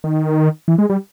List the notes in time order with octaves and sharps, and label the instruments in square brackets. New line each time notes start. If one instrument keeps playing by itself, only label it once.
[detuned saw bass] D#3
E3
G#3
G3